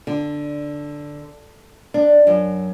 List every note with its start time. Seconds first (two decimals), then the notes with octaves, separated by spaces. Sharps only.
0.07 D3
1.94 D4
2.27 F#2